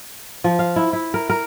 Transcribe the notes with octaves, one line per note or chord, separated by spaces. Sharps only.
F3
F5
E4
E4
A#4
A#4